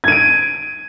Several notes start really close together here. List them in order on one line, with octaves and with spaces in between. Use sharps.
G#6 D#7 D7